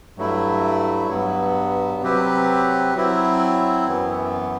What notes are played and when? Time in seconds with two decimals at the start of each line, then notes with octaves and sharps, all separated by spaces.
0.17 G2 F#3 A3 E4
1.09 G2 F#3 B3
2.02 C3 F#3 C4 G4 B4
2.95 F#3 C4 E4
3.87 F#2 E3 B3